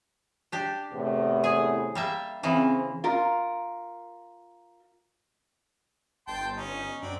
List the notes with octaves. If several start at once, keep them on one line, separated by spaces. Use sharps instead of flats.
D4 G4
E2 A2 C3
G#4
G3 A#3 E5
C#3 E3 A#3 C4
F4 A#4
G1 G5 A5 C6
C#4 D#4
F#2 C4 D4